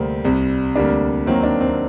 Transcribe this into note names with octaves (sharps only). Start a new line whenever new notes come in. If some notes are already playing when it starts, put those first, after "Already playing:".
Already playing: D2 C3 G3 A#3 C4
C2 C3 G3
D2 C3 G3 A#3 D4
D#2 D#3 F#3 A#3 C4
D4
C4